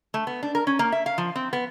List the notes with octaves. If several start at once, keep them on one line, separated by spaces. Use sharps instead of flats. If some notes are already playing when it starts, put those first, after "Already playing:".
A3
B3
D4
A#4
C#4
A#3
E5
F5
F3
C4
B3